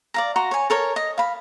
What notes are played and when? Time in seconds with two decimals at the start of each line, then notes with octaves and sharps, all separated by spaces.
0.14 D5 F5 A#5
0.36 F#4 A#5 C6
0.51 C#5 G#5
0.70 A4 A#4 C#5
0.96 D#5
1.18 F5 B5